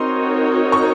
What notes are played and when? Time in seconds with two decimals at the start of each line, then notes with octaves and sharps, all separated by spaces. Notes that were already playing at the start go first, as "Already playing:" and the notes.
Already playing: C4 D#4 F#4 A#4 C#5 C6
0.72 C#6